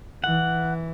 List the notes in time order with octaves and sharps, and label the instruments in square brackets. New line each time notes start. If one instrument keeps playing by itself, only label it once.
[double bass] E3 [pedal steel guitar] F#5